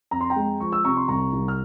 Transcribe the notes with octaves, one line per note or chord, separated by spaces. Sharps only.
F2 A#5
C6
G5 A#5
G#3
F3 C#6
E6
C3 A#5 C#6
C6
C2 A#5 C#6
C2
F6